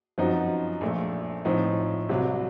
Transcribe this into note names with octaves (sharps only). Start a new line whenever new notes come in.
F#2 F3 C4 D#4 F#4
A#1 A#2 A3
A2 F3 C4 D#4
C2 C3 F#3